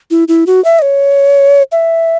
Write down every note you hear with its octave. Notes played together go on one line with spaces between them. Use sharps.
E4
E4
F#4
E5
D#5
C#5
E5